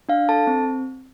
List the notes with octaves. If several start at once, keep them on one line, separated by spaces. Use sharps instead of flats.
D4 F5
A4 A5
C4